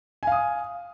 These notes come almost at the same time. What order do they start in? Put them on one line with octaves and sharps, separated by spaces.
G#5 F5 D#6